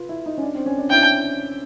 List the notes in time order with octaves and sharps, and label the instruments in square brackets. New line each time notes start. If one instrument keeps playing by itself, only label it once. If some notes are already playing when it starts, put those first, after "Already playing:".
Already playing: [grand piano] F4 B4
E4
D#4
C#4
D4
C4
C#4
D4
[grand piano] E4 [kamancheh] G5